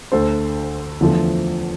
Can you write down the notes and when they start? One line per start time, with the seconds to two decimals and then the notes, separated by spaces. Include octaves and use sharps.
0.12 D2 D3 A3 A4 C5
1.01 E2 D3 F3 A3